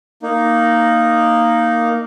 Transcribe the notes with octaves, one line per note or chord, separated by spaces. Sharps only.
A#3 D#4